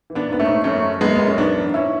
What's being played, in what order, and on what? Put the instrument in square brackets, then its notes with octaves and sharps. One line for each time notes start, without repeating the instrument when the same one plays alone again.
[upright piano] E3
B3 D4
G#2 B3
A3 C#4
G#2
F#2 A3 C#4
F#2
F#2 G#3 B3
F#2 B3
C#4
G#2 B3 D4
E3
G#2 C#4 E4